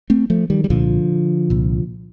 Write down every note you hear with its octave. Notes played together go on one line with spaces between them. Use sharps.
A3 C4
F3 A3
D#3 G3
G3
C2 A#2 D3 F3
C2 A#2